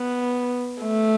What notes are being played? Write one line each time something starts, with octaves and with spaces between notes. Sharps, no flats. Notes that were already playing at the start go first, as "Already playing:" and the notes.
Already playing: B3
A3